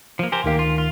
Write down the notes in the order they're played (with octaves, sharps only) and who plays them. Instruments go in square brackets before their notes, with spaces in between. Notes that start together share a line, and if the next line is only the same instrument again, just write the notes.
[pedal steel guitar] F3 A#3
[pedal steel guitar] G4 A#4 C5 [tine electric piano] G#5
[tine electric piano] D2 D#3 F5 [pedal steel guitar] A#3 G4
[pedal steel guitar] F4
F4